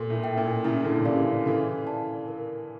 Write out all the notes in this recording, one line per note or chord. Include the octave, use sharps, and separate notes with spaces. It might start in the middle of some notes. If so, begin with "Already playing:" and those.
Already playing: A#2 A4
A2
E5 G5
A#2
A2 C#3 E4
A#2 D3
C#3 E3 G4 D5 F5
C#3 E3 A4
D5 F5 A5
A#4